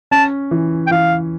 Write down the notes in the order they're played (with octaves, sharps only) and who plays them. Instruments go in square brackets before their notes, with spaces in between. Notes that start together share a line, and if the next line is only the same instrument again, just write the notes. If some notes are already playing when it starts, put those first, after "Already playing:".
[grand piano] C#4 [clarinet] A5
[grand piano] E3
[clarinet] G5
[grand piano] E3 [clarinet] F5